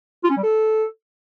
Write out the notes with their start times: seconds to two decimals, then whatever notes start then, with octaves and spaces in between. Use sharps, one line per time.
0.24 F4
0.30 C#4
0.37 G3
0.43 A4